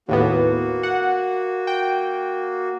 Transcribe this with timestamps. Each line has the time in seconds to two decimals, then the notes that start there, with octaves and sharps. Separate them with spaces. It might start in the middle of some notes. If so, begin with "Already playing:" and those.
0.09 D#2 A2 A#3 B3 F#4
0.83 F#5
1.67 G5